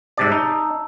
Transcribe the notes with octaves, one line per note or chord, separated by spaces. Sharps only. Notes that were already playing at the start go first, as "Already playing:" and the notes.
G#2 C3 D5 A5 E6
D#4